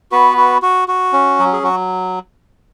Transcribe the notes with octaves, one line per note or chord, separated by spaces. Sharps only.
B3 F#4 B4
F#4
F#4
F#4
C#4
F#3
G#4
F#3 F#4